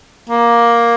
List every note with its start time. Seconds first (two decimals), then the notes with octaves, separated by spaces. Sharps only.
0.29 A#3